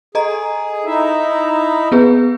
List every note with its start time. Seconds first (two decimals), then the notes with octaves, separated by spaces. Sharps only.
0.15 G#4 A4 D#5 A#5
0.85 D#4 E4 E5
1.92 B3 G#4 B4